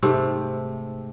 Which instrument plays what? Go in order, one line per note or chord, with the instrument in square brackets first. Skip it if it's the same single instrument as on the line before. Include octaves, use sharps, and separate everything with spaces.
[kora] G#2 C3 A3